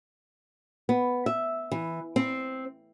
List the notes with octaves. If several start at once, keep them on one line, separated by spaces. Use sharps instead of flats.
B3
E5
E3
C4